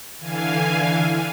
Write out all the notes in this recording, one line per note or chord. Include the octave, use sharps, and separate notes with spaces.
D3 E3 F5 G#5